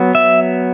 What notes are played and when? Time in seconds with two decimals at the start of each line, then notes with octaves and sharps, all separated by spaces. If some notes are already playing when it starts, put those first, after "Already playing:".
Already playing: F#3 B3
0.15 E5